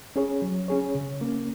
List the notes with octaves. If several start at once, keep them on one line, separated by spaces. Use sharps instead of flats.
C#4 G#4 C#5
F#3
C#4 G#4 C#5
C#3
A#3 C#4